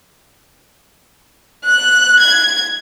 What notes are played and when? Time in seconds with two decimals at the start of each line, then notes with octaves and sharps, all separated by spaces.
1.64 F#6
2.19 G#6